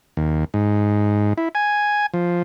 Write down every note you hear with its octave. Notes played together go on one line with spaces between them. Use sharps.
D#2
G#2
E4
G#5
F3